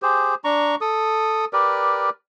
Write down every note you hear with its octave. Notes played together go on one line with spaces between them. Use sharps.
G4 G#4 C5
D4 A#5 C#6
A4 D#6
G4 A#4 B4 D5